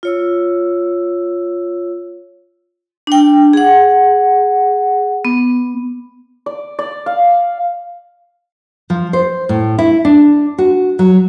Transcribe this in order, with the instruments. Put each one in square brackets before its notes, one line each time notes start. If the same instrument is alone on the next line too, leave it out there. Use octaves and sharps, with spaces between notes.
[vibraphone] F4 C#5 E6
D4 G5
G#4 F#5
B3
[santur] D5
D5
F5
[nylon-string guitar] F3
C5
A2
E4
D4
F#4
F#3